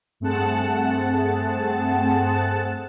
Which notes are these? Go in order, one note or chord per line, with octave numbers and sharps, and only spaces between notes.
G2 A3 C4 G#4 F#5 A5